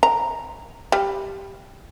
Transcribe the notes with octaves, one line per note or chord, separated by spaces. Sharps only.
A#5
G3